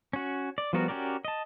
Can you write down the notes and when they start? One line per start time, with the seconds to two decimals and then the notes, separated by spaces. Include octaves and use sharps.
0.13 C#4 F#4
0.58 D5
0.73 F3 G3 B3 F#4 A#4
0.88 C#4 F#4 G4 A#4 D5
1.25 D#5 A5